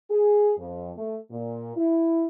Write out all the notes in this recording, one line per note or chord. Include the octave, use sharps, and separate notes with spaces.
G#4
F2
A3
A#2
E4